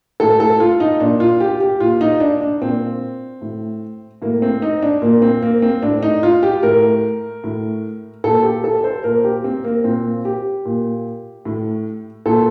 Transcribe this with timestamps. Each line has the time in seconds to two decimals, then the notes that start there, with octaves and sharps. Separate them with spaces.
0.20 A2 A4
0.40 A4
0.60 F4
0.80 D#4
1.00 A#2 D4
1.20 F4
1.40 G4
1.60 G4
1.80 A#2 F4
2.01 D#4
2.20 D4
2.41 D4
2.61 A#2 C4
3.42 A2
4.22 A2 A#3
4.42 C4
4.62 D#4
4.82 D4
5.02 A#2 A#3
5.22 C4
5.42 A#3
5.62 C4
5.83 A2 D4
6.03 D#4
6.23 F4
6.43 G4
6.63 A2 A#4
7.44 A2
8.24 A#2 A4
8.44 G4
8.64 A4
8.84 C5
9.04 A#2 A#4
9.24 G4
9.44 C4
9.64 A#3
9.84 A#2 C4
10.25 G4
10.65 A#2
11.45 A2
12.26 A#2 A4